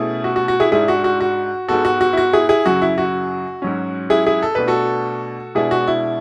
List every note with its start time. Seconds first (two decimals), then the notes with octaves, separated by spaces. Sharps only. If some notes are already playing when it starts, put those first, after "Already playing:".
Already playing: B2 A3 C#4 E4 G#4
0.24 F#4
0.36 F#4
0.48 F#4
0.60 E4 G#4
0.72 G#2 G#3 D4 E4 G#4
0.88 F#4
1.04 F#4
1.20 F#4
1.68 G#2 G#3 B3 F#4 A4
1.85 F#4
2.01 F#4
2.13 E4
2.17 F#4
2.33 E4 G#4
2.49 E4 G#4
2.66 F#2 C#3 F#3 F#4
2.82 E4
2.98 F#4
3.62 G#2 F#3 C#4
4.10 E4 G#4
4.26 E4 G#4
4.42 A4
4.55 B2 A3 D4 B4
4.68 F#4 A4
5.55 B2 G#3 D4 E4 G#4
5.71 F#4
5.87 E4